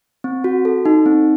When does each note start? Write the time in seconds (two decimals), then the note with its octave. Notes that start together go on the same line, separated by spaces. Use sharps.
0.24 C4
0.44 F#4
0.65 A4
0.85 D#4
1.06 C4